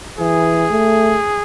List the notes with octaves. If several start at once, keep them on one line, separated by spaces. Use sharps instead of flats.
E3 G#4
A3